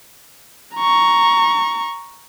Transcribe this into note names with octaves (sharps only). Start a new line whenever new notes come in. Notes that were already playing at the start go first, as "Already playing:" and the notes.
A#5 C#6